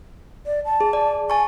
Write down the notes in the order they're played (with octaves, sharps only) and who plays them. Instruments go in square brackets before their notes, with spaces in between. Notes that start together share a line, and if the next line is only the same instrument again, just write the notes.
[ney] D5
A5
[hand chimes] G#4
D5
[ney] G#5 [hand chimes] A5 C#6